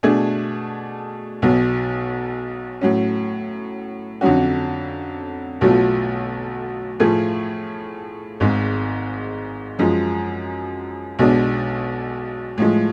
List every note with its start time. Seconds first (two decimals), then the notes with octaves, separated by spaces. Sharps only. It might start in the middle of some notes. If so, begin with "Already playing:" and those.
0.03 B2 A3 D4 G#4
1.42 B1 B2 F#3
2.81 A2 F#3 C#4
4.21 F2 D3 F#3 C#4 F#4
5.61 B1 B2 F#3 A3 F4
7.00 A2 F3 A3 F4 G#4
8.40 G#1 G#2 G#3
9.79 F#2 F3 G#3
11.19 B1 B2 G#3 D4
12.58 A2 F3 G#3